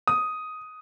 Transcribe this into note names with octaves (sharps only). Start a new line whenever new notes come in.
D#6